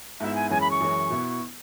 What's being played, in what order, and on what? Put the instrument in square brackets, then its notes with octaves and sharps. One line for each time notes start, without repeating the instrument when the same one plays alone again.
[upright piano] G#2 G#3 B3 E4 [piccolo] E5
[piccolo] G#5
[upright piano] F#2 E3 G#3 C#4 [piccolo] G#5
[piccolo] B5
C#6
[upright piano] F#2 E3 G#3 C#4
B2 B3 E4